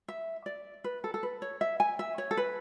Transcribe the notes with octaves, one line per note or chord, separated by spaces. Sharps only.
E5
D5
B4
A4
A4
B4
C#5
E5
G#5
E5
C#5
A4
B4